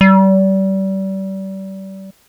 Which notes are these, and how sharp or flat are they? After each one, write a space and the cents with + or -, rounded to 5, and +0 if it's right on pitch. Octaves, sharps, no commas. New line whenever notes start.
G3 -30